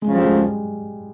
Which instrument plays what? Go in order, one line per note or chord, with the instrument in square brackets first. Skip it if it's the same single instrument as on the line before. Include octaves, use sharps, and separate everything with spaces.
[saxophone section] D2 C#3 F3 [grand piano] G#3
[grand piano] G3
G#3
G#3